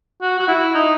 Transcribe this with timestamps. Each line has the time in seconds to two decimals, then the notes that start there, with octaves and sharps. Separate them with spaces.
0.22 F#4
0.39 F#4
0.48 E4
0.75 D#4